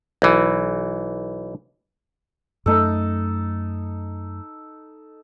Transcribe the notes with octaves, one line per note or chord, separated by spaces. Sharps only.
B1 E3
F#2 A3 D#4 A4